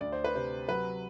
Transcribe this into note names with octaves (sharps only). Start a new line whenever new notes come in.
D2 D5
C5
B4
C3 C5
F#3 B4